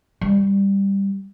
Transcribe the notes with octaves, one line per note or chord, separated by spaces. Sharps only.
G3